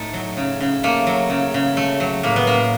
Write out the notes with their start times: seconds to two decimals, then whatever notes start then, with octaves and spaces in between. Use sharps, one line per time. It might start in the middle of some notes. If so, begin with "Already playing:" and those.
Already playing: A2 A3 D#4
0.14 F#3
0.37 C#3
0.61 C#3
0.84 A3 A#3
1.07 F#3
1.30 C#3
1.54 C#3
1.77 A3
2.00 F#3
2.23 A2 A#3
2.36 B3
2.47 A2 A#3